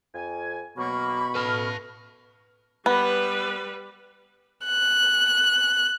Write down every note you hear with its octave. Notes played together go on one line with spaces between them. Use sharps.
F2 G#5
B2 F#3 A#3 B5 C#6
A4 B4 A5 F6
G3 B3 B4
F#6